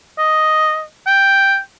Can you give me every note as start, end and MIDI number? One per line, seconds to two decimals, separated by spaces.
0.19 0.84 75
1.07 1.59 79